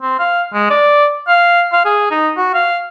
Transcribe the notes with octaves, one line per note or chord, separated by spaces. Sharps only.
C4
F5
G#3
D5
F5
F5
G#4
D#4
F#4
F5